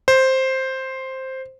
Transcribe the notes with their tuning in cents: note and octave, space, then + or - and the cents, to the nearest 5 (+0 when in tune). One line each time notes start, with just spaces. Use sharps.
C5 +5